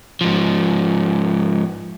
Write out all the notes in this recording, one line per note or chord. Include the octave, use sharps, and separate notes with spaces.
G#2 F3